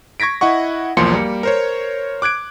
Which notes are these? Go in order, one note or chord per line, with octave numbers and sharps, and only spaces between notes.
C#6 G#6 A#6 B6 D7
E4 D#5 F#5 C#6
B1 E2 F3 A#3 C6 C#7
G3 A#3
A#4 C5 C#5
D6 F#6 G#6 D7